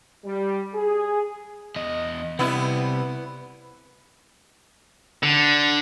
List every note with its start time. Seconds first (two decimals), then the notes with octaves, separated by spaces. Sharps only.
0.24 G3
0.73 G#4
1.76 E2 D#5
2.39 C3 G3 B3 E4
5.23 D3